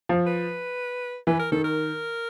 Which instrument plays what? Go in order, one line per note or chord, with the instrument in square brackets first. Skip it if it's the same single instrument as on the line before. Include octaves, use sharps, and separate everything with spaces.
[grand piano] F3
[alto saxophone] B4
[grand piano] E3 [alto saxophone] B4
[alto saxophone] A#4
[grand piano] D#3 [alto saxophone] A4
[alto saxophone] A#4